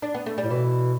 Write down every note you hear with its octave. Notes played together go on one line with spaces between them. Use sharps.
D4
B3
A3
G3
A2
B2 E3